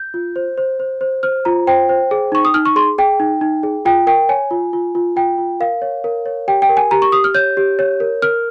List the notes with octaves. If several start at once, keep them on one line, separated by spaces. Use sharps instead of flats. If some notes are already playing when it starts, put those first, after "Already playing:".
Already playing: G6
F4
C5
C5
C5
C5
C5 F6
F4 A#5
C5 G5
C5
G#4
D#4 C#6
D#6
D#4 F6
C#6
G#4 C6
G#4 G5
D#4
D#4
G#4
F4 G5
A#4 G5
C#5 G#5
F4
F4
F4
F4 G5
F4
A#4 F5
C#5
A#4
C#5
G4 G5
G5
A#4
G#5
G4 A#5
C#6
G4 D#6
F6
C#5 G6
G4
C#5
A#4
A#4 F6